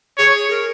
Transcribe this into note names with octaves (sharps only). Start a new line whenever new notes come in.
G#4 C#5
A#4